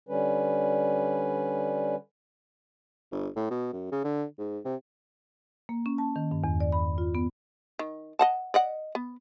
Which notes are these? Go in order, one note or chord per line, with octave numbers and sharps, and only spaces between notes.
D3 G3 C#4 B4
G1
A2
B2
F#2
C#3
D3
G#2
C3
A#3
C#4
A5
D#3
G2
E2
D5
B5
F4
B3
D#3
D#5 F#5 A5
D5 D#5 F#5
B3